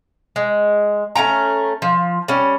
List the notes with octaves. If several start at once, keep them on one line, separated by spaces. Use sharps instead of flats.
G#3
A3 C#4 G5 A#5
F3
G3 C#4